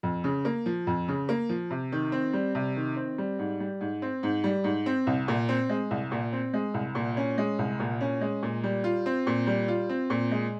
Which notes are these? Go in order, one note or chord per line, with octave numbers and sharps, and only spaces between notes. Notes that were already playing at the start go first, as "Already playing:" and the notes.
F2
C#3
A#3
F3
F2
C#3
A#3
F3
C3
D#3
C4
G3
C3
D#3
C4
G3
G#2
G3
G#2
C4
G#2
G3
G#2
C4
C2
A#2
C4
G#3
C2
A#2
C4
G#3
C2
A#2
C#4
G#3
C2
A#2
C#4
G#3
A#2
G3
F4
C4
A#2
G3
F4
C4
A#2
G#3